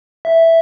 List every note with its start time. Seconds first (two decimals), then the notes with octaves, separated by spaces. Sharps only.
0.25 E5